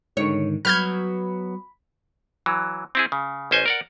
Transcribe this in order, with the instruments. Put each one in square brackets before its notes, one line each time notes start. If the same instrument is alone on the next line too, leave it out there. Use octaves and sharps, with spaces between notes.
[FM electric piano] G#2 D3 D#3 [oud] C#5
[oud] F#3 B3 [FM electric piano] B5 [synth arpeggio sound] F6 G6 G#6
[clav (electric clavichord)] E3 F#3
C4 E4 G#4
C#3
A1 C#4 C5 D#5 G#5
A#4 D5 F#5